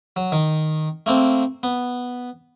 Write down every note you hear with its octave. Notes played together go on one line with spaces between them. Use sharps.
F#3
D#3
A3 A#3 C4
B3